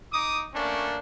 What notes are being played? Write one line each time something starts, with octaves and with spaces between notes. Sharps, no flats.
D#4 D6 D#6
A3 A#3 C#4 D4